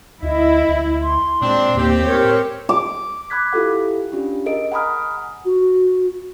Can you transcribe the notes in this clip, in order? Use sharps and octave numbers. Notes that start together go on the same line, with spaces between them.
D2 E4 D#5
D2
C6
A#2 G#3 C4 D4
D#2 A2 C4 G4
A#4 C#5
D6
B5 D6 F#6 G#6 B6
E4 F4 G4 A4 F#5
C#4 D4 F4 G4
G#4 A#4 D#5 D7
F#5 G#5 A#5 B5 D#6 F6
F#4